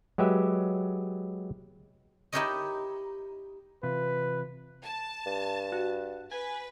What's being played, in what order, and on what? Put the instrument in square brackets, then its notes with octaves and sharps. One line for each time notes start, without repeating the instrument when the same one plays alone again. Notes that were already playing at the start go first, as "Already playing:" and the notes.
[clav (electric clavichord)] F#3 G#3 G4 B4 E5
[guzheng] D#4 E4 G4 A#4 C#5 D#5
[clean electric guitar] C3 E3 F4 [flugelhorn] B4
[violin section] A5
[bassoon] G2
[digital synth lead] F#4
[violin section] B4 [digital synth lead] G#5